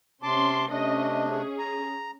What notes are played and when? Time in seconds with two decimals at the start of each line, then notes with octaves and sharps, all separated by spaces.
0.23 C3 C#4 A5 C6 D6
0.70 C3 A3 C#4 D4 D#5
1.28 C#4 G#4
1.59 A#5